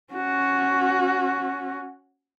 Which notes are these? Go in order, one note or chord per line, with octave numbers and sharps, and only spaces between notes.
C#4 F#4